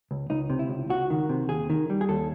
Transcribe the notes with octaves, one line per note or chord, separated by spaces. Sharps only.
C#2
C#2 D#4
C3
E4
C#2
C#2 F#4
D#3
C3
D#2 G#4
D#3
G3
G#4
D#2 A4